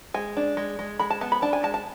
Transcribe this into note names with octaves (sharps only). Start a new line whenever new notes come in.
G#3 G#5
D4
G#3
G#3
G#3 B5
A5
B3 A5
B5
D4 A5
G#5
G#3 A5
A5